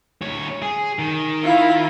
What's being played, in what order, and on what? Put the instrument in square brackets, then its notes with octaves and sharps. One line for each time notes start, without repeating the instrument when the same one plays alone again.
[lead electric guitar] D2 C#5
G#4
D#3
[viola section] E4 [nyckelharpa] F4 F5